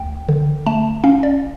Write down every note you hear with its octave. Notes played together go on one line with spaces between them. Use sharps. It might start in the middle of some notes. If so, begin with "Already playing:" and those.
Already playing: D2 G5
D3
A3 A5
C#4 F5
D5